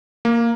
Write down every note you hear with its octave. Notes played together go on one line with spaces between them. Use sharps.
A#3